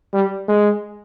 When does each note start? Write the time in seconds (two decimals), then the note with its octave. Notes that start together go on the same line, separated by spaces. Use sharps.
0.13 G3
0.48 G#3